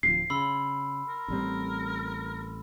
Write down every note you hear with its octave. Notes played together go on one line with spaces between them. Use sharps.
D1 F3 C7
C#3 B5 C6 E6
A#4
A1 G3 C4